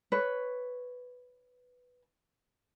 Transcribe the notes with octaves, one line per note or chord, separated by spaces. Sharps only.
B4 C#5